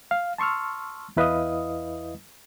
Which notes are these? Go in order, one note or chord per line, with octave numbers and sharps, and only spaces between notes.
F5
A5 C6 C#6 E6 F6
E2 E4 B4 D#5 F5 D#6